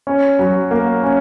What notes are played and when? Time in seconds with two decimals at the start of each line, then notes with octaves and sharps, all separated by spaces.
0.07 C#4
0.39 F#3
0.71 A#3
1.03 C#4